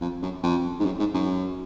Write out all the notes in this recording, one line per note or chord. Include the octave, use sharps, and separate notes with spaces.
F2
F#2
F2
G#2
F#2
G#2
F#2